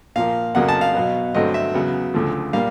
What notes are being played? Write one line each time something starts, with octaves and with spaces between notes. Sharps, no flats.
A#2 F3 A#3 F5
F2 C#3 F#3 A#3 F#5
A5
F5
B2 F#3 B3
G2 D3 F#3 A3 C4 D#5
E5
E2 C#3 F#3 B3
D2 C#3 F3 A3
A#2 G3 A#3 F5